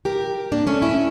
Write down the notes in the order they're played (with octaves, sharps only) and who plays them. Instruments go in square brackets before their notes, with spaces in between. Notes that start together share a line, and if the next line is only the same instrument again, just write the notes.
[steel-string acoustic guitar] G4 A#4
A#3 D4
A3 C#4
C#4 E4